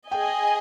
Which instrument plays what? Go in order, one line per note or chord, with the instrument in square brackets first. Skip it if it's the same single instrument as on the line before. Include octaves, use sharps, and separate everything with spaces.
[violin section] G#4 D#5 G#5 [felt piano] G5